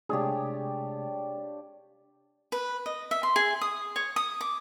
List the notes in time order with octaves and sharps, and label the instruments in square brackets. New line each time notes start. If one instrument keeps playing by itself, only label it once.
[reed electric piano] C3 G#3 A3 [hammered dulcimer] D4 C#5 [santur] F4 G4 [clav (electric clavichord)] G#4
[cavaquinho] B4
D#5
E5
C6
G#4
D#6
C#5
D#6
D6